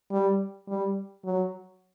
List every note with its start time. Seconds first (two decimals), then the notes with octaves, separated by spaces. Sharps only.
0.11 G3
0.68 G3
1.25 F#3